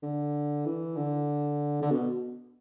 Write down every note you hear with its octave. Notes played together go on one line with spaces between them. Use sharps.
D3
E3
D3
D3
B2